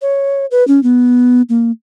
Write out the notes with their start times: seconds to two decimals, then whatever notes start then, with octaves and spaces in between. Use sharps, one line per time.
0.02 C#5
0.51 B4
0.68 C#4
0.83 B3
1.49 A#3